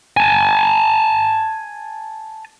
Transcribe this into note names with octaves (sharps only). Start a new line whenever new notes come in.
G#5 A5